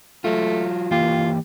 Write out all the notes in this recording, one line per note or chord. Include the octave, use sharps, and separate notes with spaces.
F#3 A3 F4
E3 A#3 F4 G4